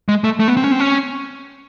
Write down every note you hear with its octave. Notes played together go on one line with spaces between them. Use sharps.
G#3
A3
A3
B3
C4
C#4
C4
C#4